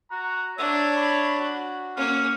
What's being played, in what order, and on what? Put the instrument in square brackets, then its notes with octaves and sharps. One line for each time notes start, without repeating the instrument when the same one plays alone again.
[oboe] F#4 [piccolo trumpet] A#5
[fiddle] D4 [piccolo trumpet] C#5 [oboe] E5
[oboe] B5
[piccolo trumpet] F#4
[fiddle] A#3 C#4 [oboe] F5